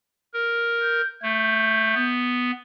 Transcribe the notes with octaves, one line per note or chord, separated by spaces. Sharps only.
A#4
G6
A3 G6
B3